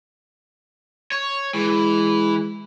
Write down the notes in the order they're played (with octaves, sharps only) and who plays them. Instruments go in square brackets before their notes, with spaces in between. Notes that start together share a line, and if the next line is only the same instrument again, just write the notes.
[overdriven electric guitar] C#5
[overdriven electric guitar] E3 [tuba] G#3